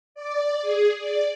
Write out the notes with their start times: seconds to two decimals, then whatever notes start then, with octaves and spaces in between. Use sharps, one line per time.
0.15 D5
0.62 G#4
0.99 D5